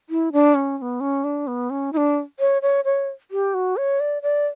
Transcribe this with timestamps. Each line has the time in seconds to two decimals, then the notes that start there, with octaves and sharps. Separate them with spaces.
0.10 E4
0.33 D4
0.55 C#4
0.78 C#4
0.82 B3
1.00 C#4
1.24 D4
1.47 B3
1.70 C#4
1.93 E4
1.97 D4
2.40 C#5
2.62 C#5
2.85 C#5
3.31 G4
3.54 F#4
3.77 C#5
4.00 D5
4.22 D5